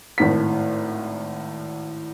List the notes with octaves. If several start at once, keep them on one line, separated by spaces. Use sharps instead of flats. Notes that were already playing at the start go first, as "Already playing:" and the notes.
G#1 A2 B6